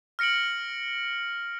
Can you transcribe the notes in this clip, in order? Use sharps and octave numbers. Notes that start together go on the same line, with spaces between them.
F6 A#6 C#7 D7 F#7